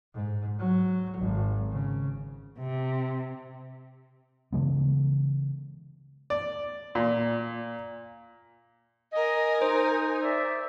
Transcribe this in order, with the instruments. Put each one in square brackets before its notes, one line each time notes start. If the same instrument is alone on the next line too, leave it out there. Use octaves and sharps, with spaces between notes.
[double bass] G#2
F#3
G#1
C#3
[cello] C3
[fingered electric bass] C#3 E3 G#3 B3
[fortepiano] D5
A#2
[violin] A#4 G#5 [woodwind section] D#5
[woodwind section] D#4 [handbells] C5
[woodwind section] D5 E5